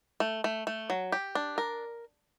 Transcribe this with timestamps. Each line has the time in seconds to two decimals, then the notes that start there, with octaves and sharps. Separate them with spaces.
0.20 A3
0.44 A3
0.67 A3
0.90 F#3
1.12 G4
1.35 D4
1.58 A#4